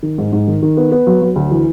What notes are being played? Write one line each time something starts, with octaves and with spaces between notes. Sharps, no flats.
D#3
G#2
G#2
D#3
D#3
B3
B3
F#3
F#3
D2
E3